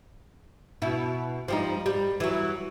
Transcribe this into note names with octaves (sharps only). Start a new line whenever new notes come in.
B2 E4
F3 G3 D#4
G3
E3 F#3